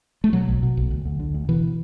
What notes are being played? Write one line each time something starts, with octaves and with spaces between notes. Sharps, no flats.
A3
B2 F#3
B1
B2
B1
D2
D2
D3
D2
B2 E3